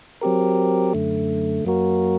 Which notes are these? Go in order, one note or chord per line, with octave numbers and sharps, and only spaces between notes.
F#3 C4 G4 A#4
F#2 D3 A3
F#2 F#3 A#3 F#4 A#4